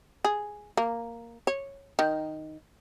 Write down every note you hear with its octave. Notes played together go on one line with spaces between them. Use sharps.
G#4
A#3
C#5
D#3